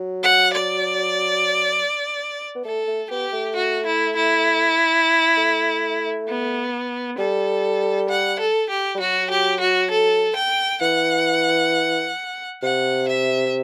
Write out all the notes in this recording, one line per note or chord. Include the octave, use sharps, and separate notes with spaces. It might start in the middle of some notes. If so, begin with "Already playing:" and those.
Already playing: F#3
F#5
D5
B3
A3 A4
A3
B3 G4
A3
F#4
E4
E4
A3
B3
G3 A4
F#5
A4
G4
G3
F#3 F#4
G4
F#4
A4
G5
E3 F#5
C3 F#5
E5